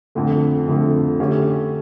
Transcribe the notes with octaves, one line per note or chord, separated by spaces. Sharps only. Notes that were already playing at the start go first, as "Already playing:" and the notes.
F2 D3 A3
F2 D3 A3
D3 A3 C#4 G4